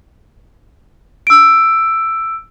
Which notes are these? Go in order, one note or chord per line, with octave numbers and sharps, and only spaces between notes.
E6 D7